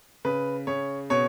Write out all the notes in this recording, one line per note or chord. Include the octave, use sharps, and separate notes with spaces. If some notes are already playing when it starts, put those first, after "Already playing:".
C#3 B4
C#3 C#5
B2 C#5